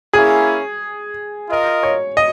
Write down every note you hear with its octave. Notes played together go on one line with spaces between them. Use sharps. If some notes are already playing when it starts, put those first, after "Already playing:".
A#3 C#4 E4 G#4
F4 A#4 D#5
C#5
D#5